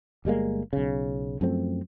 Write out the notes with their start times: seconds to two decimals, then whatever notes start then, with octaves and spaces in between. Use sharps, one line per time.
0.25 G1 G3 G#3 A#3
0.73 B1 C#3
1.41 F#2 F3 A3 C4